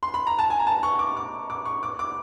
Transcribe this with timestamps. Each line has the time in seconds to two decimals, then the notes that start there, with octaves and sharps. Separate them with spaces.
0.03 C6
0.14 B5
0.27 A#5
0.39 A5
0.50 G#5
0.59 A#5
0.67 A5
0.83 C#6
0.99 D6
1.17 D6
1.50 D6
1.65 C#6
1.83 D6
1.99 D6